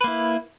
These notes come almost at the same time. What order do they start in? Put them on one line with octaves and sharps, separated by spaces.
B4 A#3 E4